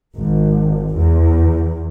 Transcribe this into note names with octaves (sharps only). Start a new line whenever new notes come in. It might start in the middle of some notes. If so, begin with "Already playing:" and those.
G#1
E2